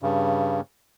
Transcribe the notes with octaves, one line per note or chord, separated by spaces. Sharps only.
G2 C#3